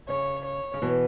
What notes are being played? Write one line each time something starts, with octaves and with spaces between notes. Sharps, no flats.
C#3 C#5
C#5
C#3
B2 E3